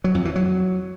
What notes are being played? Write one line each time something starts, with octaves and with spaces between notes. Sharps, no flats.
F#3
F2
E3
F#3